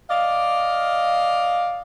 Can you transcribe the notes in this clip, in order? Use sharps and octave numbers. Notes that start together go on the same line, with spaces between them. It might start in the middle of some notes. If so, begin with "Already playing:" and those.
D5 D#5 F5